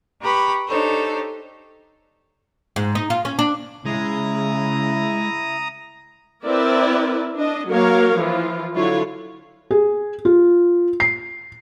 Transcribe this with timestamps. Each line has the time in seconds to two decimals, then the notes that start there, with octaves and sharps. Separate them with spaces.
0.21 G4 B4 A#5 B5 C#6
0.66 D4 D#4 G4 A4 C5 C#5
2.76 G#2
2.95 D#4
3.10 F4
3.25 C#4
3.39 D4
3.86 C#3 G#3 E4 A#5 D#6
6.44 C4 E4 A#4 B4 D5
7.38 D4 D#5
7.69 F#3 A#3 A#4 C#5 F5
8.20 E3 F3 F4
8.75 D3 F#3 E4 F4 C#5
9.71 G#4
10.25 F4
11.00 C7